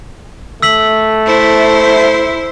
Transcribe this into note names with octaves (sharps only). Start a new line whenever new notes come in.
A3 E6 B6 F#7
E4 C5